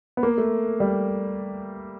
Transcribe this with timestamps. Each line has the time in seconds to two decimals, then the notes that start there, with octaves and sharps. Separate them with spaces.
0.17 B3
0.23 A#3
0.38 A3
0.80 G3